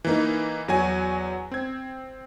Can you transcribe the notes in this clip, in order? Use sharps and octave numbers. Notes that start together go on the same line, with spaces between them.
E3 A#3 D#4
E2 F#3 F#4 G#5
C4 G#6